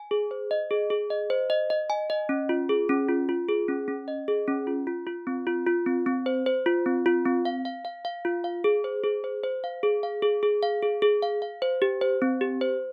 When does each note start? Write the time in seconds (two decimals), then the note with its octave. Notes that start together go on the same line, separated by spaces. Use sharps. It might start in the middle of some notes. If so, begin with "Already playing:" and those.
Already playing: G#5
0.11 G#4
0.31 C5
0.51 D#5
0.71 G#4
0.90 G#4
1.10 D#5
1.30 C5
1.50 D#5
1.70 D#5
1.90 G#5
2.10 D#5
2.29 C#4
2.49 F4
2.69 G#4
2.89 C#4
3.08 F4
3.29 F4
3.49 G#4
3.68 C#4
3.88 C#4
4.08 D#5
4.28 G#4
4.48 C#4
4.67 F4
4.87 F4
5.07 F4
5.27 C4
5.47 F4
5.67 F4
5.86 C4
6.06 C4
6.26 C5
6.46 C5
6.66 F4
6.86 C4
7.06 F4
7.26 C4
7.45 F5
7.65 F5
7.85 F5
8.05 F5
8.25 F4
8.44 F5
8.64 G#4
8.84 C5
9.04 G#4
9.24 C5
9.44 C5
9.64 F5
9.83 G#4
10.03 F5
10.22 G#4
10.43 G#4
10.63 F5
10.82 G#4
11.02 G#4
11.22 F5
11.42 F5
11.62 C5
11.82 G4
12.01 C5
12.22 C4
12.41 G4
12.61 C5